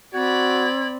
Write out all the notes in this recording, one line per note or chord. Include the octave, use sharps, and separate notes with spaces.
C4 F#4 D5 B5 G#6